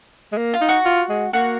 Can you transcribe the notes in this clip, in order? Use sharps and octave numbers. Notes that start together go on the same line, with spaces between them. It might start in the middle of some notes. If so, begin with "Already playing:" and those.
G#3
A#3
F4
D#4
F#4
F4
G#3
A#3 F#4